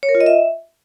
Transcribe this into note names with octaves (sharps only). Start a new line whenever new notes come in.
C#5
A#4
F4
D#5
E5